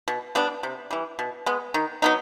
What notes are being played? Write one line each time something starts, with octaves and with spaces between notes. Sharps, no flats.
B2
G3 B3 D4
C3
E3 G3
B2
G#3 B3
D#3
F#3 B3 D#4